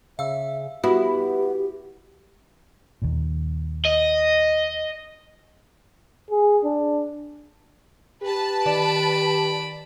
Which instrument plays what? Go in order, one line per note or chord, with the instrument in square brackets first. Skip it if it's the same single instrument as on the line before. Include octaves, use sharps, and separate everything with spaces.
[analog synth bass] C#3 [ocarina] E5 [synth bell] F5 E6
[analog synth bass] B3 [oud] E4 [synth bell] F#4 [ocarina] G4
[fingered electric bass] D#2 A#2
[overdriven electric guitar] D#5
[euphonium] G#4
D4
[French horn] G4 [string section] B4 A5
[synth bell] D#3 D5 E7 [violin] B5 D7